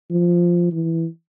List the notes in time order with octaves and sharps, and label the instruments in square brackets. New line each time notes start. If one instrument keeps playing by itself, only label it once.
[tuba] F3
E3